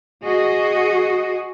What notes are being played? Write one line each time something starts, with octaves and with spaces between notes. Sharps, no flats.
F#4 G#4 D#5